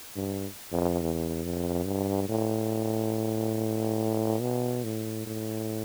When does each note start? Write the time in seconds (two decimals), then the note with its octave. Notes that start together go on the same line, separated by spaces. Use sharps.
0.16 G2
0.72 F2
1.01 E2
1.44 F2
1.86 G2
2.29 A2
4.41 B2
4.84 A2
5.26 A2